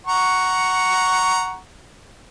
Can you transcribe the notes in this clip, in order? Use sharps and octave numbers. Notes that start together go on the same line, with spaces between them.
F#5 A#5 C#6